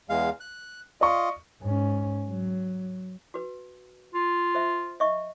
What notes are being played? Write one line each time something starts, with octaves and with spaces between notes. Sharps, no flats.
E2 G#3 F5
F#6
F4 D5 D#5 C#6
G#2 C#4
F#3
F#4 B4
F4
C5 E5
D#5 E5 C#6